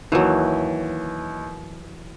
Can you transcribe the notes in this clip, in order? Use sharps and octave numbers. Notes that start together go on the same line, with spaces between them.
D#2 E3 F#3